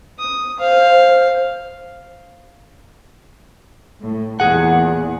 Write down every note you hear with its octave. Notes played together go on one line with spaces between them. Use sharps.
D#6
C5 F5
A2
E2 A#2 G#4 F#5